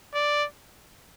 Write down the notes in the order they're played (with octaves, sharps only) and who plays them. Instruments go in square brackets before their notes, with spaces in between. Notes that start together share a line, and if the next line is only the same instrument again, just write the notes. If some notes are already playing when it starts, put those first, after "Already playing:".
[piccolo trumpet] D5